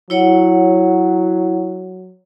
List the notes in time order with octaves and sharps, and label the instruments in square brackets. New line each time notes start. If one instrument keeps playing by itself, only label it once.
[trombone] F#3 [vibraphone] E4 C#5 F#5